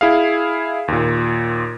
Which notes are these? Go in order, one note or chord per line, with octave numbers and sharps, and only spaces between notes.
E4 G#4 F5
D#2 A#2